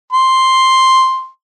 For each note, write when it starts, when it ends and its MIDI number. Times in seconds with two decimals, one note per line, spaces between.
0.13 1.27 84